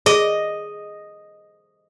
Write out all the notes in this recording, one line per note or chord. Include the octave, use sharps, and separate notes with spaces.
G#4 D#5